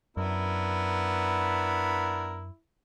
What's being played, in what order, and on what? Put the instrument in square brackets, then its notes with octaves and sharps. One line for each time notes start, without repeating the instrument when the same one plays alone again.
[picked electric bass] F#2 [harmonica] B3 D4 A#4 [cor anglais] E4